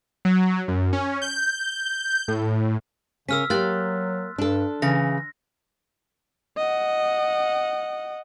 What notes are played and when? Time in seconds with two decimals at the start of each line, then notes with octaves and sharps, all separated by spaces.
0.25 F#3
0.68 F#2
0.93 C#4
1.22 G6
2.28 A2
3.29 C#3 C#4 A#4 E6 F6 B6
3.50 F#3 A#3 G4 C6 F#6 A6
4.38 G2 D4 A4
4.82 C#3 E3 A#6
6.57 D#5 F#5